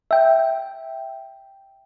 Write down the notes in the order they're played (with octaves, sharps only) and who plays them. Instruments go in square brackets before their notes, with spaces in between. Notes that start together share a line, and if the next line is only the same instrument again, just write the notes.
[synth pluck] E5 G5